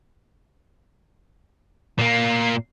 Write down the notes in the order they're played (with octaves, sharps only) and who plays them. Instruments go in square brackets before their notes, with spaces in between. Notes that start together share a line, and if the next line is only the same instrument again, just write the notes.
[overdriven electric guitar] A#2 A#3